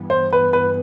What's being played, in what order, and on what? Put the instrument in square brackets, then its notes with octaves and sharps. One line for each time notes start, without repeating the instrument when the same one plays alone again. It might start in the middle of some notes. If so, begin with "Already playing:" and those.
Already playing: [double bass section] G2 E3 G3 B3
[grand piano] C5
B4
B4